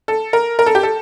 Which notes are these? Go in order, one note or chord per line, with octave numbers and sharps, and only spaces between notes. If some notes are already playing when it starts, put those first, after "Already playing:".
A4
A#4
A#4
A4
G4
A4